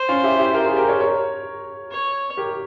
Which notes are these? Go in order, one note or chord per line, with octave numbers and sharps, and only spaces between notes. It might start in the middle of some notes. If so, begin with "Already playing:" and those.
Already playing: C5
C#4 F4
E4 G4
E4 G4
G4 A#4 C5
F4 G#4
G4 A#4
A#4 C#5
A#4 C#5
C#5
G4 A#4